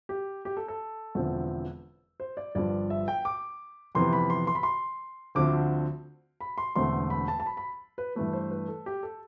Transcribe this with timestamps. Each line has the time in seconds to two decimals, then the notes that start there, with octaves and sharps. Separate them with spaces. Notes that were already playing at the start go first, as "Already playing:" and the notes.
0.09 G4
0.45 G4
0.57 A4
0.68 A4
1.15 E1 E2 D3 F3 C4
2.20 C5
2.37 D5
2.55 G1 G2 F3 D5
2.90 E5
3.08 G5
3.25 D6
3.95 F2 C3 E3 B3 C6
4.13 B5
4.30 C6
4.47 C6
4.55 B5
4.63 C6
5.35 D2 D3 F3 C4 D6
6.41 B5
6.58 C6
6.76 E1 E2 D3 A3 C4 C6
7.10 B5
7.28 A5
7.40 A5
7.46 B5
7.57 B5
7.98 B4
8.16 G2 E3 A3 B4
8.33 C5
8.51 B4
8.68 A4
8.86 G4
9.03 A4